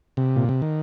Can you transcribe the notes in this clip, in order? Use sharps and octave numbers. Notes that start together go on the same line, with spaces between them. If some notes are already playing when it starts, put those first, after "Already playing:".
C3
A#2
C3
D#3